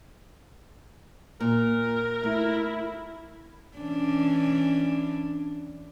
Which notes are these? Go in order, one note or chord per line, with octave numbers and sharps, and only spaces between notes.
A#2 A#4
A3 E4
E3 C#4 D4